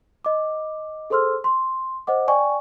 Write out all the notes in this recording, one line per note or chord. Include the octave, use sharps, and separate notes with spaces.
D#5 D6
G#4 A4 C5 C6 E6 F6
C6
C5 D#5 F#5 D6
D5 G5 G#5 C#6